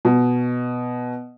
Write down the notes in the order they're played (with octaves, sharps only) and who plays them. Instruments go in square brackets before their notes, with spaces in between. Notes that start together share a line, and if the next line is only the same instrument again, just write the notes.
[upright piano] B2